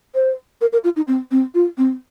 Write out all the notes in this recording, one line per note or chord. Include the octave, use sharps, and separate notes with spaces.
C5
A#4
A#4
F4
D#4
C4
C4
F4
C4